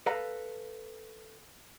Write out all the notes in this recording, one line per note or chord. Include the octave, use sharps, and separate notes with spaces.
A4 B4 F5 A#5